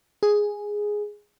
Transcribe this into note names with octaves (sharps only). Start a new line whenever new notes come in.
G#4